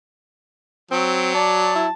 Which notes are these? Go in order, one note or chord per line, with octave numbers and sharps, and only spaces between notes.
F#3 C4 D7
D5 A5
E4